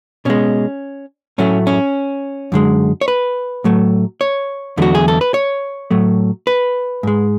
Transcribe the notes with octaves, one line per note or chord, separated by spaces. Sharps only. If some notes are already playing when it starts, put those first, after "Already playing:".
B2 G#3 C#4
A2 F#3 A3 C#4
C#4
F#2 D3 G#3
C#5
B4
A2 F#3 A3
C#5
E2 D3 F#3 A3 F#4
G#4
A4
B4
C#5
A2 F#3 A3
B4
G#2 G#3